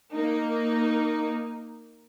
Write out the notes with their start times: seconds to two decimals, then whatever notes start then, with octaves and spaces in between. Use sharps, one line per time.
0.13 A#3 D#4